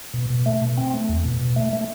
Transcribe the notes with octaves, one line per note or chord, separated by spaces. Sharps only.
B2
B2
A3
B2
C4
A3
E2
B2
B2
A3
A3